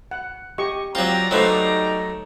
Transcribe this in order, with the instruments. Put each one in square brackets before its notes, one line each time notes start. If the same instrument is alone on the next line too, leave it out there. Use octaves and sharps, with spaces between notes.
[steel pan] F#5
G4 D#5 C#6
[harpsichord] F#3 F4 [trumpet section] G3 D5 A#5 [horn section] C4
[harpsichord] F#3 A3 [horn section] D#4 [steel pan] B4 C5 F5